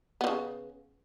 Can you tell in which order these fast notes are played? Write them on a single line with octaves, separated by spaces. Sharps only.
B3 F3 C#3